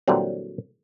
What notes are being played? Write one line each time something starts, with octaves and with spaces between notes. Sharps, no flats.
A#2 D3 E3 F#3 G3 C4